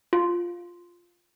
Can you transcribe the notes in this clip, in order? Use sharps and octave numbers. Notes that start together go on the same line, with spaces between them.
F4